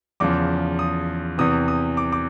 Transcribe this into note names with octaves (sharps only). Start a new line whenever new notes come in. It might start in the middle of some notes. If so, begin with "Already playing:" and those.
E2 C#3 F3 D6
D#6
E2 C3 E3 D#6
D#6
D6
D6